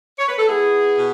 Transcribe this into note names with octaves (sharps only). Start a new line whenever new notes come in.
C#5
B4
A4
B3 E4 G#4
B2